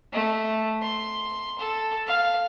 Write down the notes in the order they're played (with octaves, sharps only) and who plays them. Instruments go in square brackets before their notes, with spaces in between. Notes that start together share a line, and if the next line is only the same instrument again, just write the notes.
[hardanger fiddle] A3
C6
A4
F5